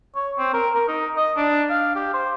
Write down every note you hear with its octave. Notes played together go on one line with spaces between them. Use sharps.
C#5
C4
A#4
A#4
D#4
D#5
D4
F5
G4
C5